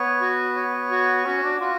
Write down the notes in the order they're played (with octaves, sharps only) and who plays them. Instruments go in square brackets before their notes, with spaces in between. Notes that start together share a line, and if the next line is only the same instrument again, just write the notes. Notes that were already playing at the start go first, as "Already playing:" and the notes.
Already playing: [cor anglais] B3 [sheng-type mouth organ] C#5
[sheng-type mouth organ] F#4
C#5
F#4
[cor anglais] C#4 [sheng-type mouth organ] F#4
[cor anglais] D4
[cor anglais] F4 [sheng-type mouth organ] F#4